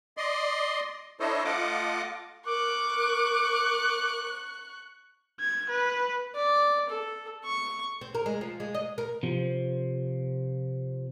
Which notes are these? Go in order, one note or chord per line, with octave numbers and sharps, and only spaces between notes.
D5 D#5 C6
D4 E4 A4 C5 C#5 D#5
A3 F4 D#5 F#5 D6
A#4 C#6 D6 F#6
G#6
B4
D5
A4
C#6
C4
A#4
G#3
F3
G#3
D#5
A#4
C3 F3